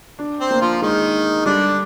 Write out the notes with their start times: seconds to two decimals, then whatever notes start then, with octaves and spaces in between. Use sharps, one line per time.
0.19 D4
0.40 C4 C5
0.51 A#3
0.61 F3 F4
0.82 D#3 G#3 D#4
1.45 D3 G3 D4